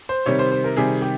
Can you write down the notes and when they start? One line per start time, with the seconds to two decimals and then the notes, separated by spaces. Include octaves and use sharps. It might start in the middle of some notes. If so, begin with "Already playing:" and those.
0.09 C5
0.26 C3 D#3 G3 C#5
0.39 C5
0.52 C5
0.64 A#4
0.77 C3 D#3 G3 G#4
1.02 G4